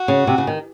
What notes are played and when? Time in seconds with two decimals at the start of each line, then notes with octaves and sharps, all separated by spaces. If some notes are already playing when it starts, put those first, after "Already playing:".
Already playing: F#4
0.08 C#3
0.27 C3
0.38 C#3
0.47 D#3